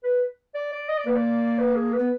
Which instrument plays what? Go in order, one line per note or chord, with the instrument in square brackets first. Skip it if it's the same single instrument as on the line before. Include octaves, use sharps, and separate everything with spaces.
[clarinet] B4
D5
D5
D#5
D5
[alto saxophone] A#3 [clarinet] B4
[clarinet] D5
B4
G#4
B4
[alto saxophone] B3